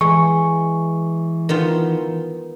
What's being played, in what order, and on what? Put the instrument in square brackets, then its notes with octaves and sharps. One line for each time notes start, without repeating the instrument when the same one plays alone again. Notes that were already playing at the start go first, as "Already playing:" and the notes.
[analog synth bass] E3 [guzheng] G#3 [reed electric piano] C#6
[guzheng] D#3 B3 F4